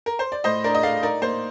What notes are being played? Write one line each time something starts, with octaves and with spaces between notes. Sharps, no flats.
A#4
C5
D5
A2 C5 D#5
D4 A#4 D5
D#5
A3 D5 F5
D#4 A#4 D5
A#3 C5